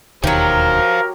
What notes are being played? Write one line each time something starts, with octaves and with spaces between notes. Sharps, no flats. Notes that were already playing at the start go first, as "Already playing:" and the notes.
E1 D#2 D#3 F#3 G4 A#4 C5 F5